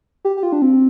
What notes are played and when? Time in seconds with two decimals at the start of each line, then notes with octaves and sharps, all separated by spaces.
0.25 G4
0.37 G4
0.43 F4
0.52 D4
0.62 C4